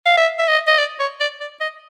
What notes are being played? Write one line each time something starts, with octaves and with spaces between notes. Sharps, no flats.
F5
E5
E5
D#5
D#5
D5
C#5
D5
D5
D#5